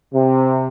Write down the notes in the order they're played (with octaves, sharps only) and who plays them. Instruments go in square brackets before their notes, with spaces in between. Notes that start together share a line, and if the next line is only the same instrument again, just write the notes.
[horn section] C3